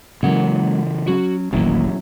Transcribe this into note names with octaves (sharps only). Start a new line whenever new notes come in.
C#3 E3 F#3 G#3 A#3 C#4 F#5
F#3 C#4 F#4
E1 A1 A#2 D#3 F#3 A#3 C#4 E4